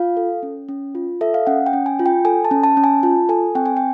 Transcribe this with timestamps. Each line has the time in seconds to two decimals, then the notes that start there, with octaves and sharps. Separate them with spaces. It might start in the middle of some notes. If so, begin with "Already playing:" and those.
Already playing: F4 F5
0.17 A4
0.43 C#4
0.69 C#4
0.95 F4
1.21 A4 E5
1.34 F5
1.47 C#4 F#5
1.66 G5
1.73 C#4
1.86 G#5
1.99 F4
2.06 G5
2.25 A4 G#5
2.45 A5
2.51 C#4
2.64 A5
2.77 C#4
2.84 G#5
3.03 F4 A5
3.29 A4 G#5
3.55 C4 G5
3.66 G#5
3.77 G5